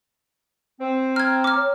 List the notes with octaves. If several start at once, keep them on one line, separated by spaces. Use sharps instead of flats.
C4
A#5 F6 G#6
D6 F6
C#5